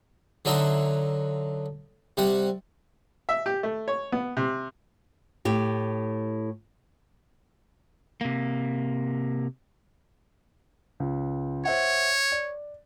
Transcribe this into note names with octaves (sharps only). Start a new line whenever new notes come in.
D3 F#3 D#4 E5 F#5 C6
C3 G3 F#5
E5
G4
A3
C#5
B3
C3
A2 G4
C3 A#3
C#2
C5 C#5 E5 F#5
D5